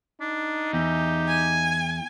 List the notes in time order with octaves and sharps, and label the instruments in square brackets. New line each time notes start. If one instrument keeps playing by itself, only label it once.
[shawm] D4 [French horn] D#4
[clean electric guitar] E2 [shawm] G4
[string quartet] G#5